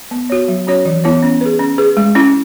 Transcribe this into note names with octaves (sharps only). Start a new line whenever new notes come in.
B3
F#4 C#5
F#3
C#4 F#4 C#5
E3
B3 E4 C#5
C#4
G#4 B4
C#4
G#4 B4
G#3
C#4 E4